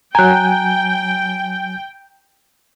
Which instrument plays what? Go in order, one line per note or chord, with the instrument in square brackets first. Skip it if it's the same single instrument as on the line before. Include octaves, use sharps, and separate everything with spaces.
[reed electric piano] F#3 G#5 [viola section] G5 [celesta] A#5 F#6